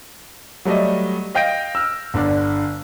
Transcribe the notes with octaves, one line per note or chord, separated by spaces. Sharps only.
F#3 G3 A3 D5 D#5
D#5 F5 G5 G6 A#6 D7
E6 F6
G1 D3 D5